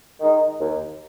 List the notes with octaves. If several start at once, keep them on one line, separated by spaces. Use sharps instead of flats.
D#3 G#3 D#4
D#2